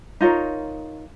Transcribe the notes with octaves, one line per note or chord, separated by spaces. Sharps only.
D#4 F4 A#4 C#5